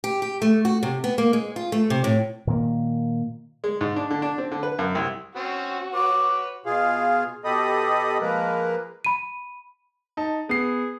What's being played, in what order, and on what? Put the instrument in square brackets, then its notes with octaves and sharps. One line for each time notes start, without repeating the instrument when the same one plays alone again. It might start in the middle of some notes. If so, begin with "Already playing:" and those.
[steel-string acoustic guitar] G4
G4
A3
F#4
C3
B3
A#3
G#3
F4
A3
C3
A2
[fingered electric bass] A#2 D#3 A#3
[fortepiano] G#3
G#2
D4
D3
D4
C4
D3
B4
F#2
C2
[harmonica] C4 C#4 [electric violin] F#4
[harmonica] B4 C#5 [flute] D6
[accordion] B2 F4 G#4 F5
B2 G4 A4 D#5 B5 D#6
F3 G#3 A#3 A#4 B4
[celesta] B5 D#7
[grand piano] D#4 A5
[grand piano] B3 C7 [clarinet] G#4